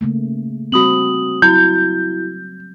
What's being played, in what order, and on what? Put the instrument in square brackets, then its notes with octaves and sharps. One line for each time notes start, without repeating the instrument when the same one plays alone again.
[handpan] C#3 A3 A#3
[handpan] G3 C4 [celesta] F#4 D#6 F#7
[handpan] F#3 [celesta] E4 F#4 [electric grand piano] G6